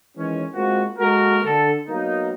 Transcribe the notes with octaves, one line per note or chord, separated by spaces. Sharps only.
D#3 E3 G#3 C#4
G#3 A#3 C4 F4 F#4
G#3 A#3 F#4 A4 A#4
D3 A4
F#3 A#3 B3 D#4